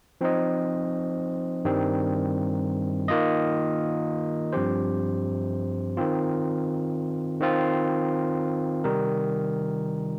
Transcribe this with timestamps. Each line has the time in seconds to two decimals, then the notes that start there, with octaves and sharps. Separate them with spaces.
0.21 F3 C4 D#4 C5 D#5
1.65 G2 D#3 G3 C4
3.08 D#3 A#3 F4 D#5
4.52 G2 F3 C4 G4 C5
5.97 D#3 C4 F4
7.41 D#3 C4 F4
8.84 C3 D#3 G3 D#4 A#4